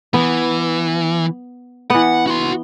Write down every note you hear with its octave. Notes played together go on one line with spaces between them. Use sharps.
E3 B3
E3 B3 F#5
F#4 C6